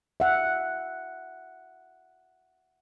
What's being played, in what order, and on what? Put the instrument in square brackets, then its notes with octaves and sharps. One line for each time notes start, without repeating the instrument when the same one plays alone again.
[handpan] E5 F#5